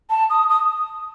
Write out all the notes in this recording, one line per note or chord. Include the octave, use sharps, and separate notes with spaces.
A5
D#6
D#6